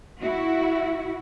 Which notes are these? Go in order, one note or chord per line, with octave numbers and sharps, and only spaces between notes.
E4 F#4